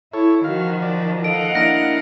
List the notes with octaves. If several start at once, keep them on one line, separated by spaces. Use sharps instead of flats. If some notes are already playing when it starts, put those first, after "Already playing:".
E4 A4 C#5
D#3 F3 F#4 F5
D5
A4 D#5 F5 F#5 D7
A#3 D4 E4 A#6 D7